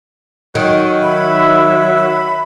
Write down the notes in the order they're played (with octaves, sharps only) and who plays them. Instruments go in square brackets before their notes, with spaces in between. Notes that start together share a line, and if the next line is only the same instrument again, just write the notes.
[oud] D#3 [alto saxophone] F#3
[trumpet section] E5 [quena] B5
[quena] B5